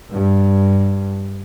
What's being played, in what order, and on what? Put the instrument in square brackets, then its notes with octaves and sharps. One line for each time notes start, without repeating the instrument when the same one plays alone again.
[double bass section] G2